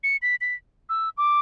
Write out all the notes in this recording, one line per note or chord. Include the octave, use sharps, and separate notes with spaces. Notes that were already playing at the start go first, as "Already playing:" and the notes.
C#7
B6
B6
E6
D6